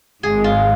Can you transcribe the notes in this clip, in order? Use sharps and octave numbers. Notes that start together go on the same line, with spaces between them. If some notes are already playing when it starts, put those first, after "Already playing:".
G#1 G#2 G#3 G#4
F4